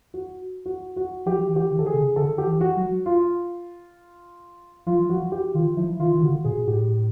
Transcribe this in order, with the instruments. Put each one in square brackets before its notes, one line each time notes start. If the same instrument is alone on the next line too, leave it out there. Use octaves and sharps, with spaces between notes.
[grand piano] F#4
F#4
F#4
[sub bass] F3 [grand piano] G4
[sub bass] E3
[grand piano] G4
[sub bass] D#3
[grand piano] A4
G#4
[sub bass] C#3
[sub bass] D3 [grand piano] A4
[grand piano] G4
[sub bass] E3
[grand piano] F#4
[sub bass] F#3
[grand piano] F4
[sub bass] F3 [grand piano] F4
[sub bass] F3 [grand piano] F#4
[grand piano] G4
[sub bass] D#3 [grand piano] F4
[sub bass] F3 [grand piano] E4
[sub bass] D#3 [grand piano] F4
[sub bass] D#3
[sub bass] D3 [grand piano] F#4
[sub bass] A#2 [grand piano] G#4
[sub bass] A2 [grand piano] G4